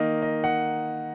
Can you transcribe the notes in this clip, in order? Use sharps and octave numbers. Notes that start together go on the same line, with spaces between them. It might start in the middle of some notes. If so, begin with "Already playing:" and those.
Already playing: D#3 A#3 D#5
D#5
F#5